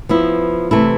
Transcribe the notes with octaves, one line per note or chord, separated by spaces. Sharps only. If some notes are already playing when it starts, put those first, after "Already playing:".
F3 B3 E4
C3 E3 A3 E4